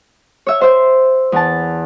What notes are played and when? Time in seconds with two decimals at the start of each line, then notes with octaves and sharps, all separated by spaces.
0.46 C#5 E5
0.61 C5 E5
1.32 E2 A5